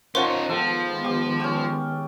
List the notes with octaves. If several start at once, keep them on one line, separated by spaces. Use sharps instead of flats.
F3 C#4 D#4 A#4 C5 F#5 C6
D#3 F3 G#3 B3 A4 G5
G4
C#4 G5